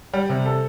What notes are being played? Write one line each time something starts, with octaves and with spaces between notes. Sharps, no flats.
G3
C3
A4